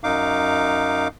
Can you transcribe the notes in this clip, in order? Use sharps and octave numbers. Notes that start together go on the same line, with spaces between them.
F#2 D#4 F5 D6